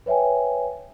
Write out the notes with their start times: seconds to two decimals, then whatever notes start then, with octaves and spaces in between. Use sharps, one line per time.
0.06 B4 C#5 E5 G5 G#5